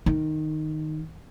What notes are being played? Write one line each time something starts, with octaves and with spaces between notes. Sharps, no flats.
D#3